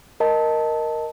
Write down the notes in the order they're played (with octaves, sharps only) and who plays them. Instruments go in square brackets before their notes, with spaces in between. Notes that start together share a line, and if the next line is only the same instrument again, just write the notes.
[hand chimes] A#4 D#5 A5